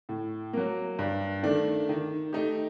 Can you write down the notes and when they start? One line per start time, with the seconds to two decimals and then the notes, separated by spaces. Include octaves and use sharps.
0.09 A2
0.53 F#3 A#3
0.99 G2
1.43 D#3 A3 D4
1.89 D#3
2.33 A3 D#4 G4